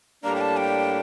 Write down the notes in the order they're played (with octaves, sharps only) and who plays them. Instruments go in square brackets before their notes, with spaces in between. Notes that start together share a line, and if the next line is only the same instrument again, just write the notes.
[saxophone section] A2 G3 A#3 D4 [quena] A#5
[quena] G5
A5
G5